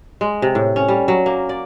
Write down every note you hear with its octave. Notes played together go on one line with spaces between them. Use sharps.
G#3
C3
A2
C#4
G3
F#3
A#3
D5